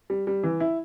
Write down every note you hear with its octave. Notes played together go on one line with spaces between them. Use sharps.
G3
G3
E3
E4